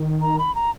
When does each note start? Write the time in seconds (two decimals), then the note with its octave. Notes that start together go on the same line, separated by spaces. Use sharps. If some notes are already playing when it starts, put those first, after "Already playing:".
Already playing: D#3
0.21 A#5
0.39 B5
0.55 A#5